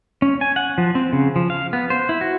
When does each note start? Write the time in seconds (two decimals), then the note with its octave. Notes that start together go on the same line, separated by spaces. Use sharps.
0.22 C#4
0.41 G#5
0.56 F#5
0.78 F3
0.95 C4
1.13 C#3
1.36 F3
1.50 F5
1.73 B3
1.90 C5
2.09 E4
2.21 F#4